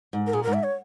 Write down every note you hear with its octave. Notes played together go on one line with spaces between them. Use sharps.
G#2
A#4
A#2 G#4
G#2 A#4
E5
C#5